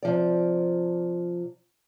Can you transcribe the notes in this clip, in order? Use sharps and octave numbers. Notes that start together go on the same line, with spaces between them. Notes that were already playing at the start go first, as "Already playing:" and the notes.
C3 F3 D5